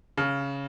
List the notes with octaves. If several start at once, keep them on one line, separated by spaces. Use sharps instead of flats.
C#3